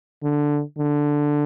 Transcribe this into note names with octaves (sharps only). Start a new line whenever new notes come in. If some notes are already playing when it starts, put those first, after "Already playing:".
D3
D3